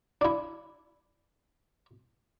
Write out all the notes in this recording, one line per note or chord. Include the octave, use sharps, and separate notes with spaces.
D4 E4